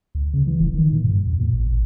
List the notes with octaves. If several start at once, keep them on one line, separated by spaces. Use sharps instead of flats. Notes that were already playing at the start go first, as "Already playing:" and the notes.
D2
C#3
E3
E1
D#3
A#2
G2
E2
A#2
A1
A1